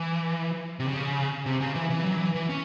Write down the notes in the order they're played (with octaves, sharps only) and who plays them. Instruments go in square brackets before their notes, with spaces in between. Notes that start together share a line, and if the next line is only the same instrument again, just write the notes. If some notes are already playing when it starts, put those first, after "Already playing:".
Already playing: [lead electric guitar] E3
C3
C#3
C3
C#3
E3
E3
F#3
E3
E3
C#4